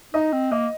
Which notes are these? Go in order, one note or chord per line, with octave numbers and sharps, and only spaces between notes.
D#4 D#5
C4
A#3 D#5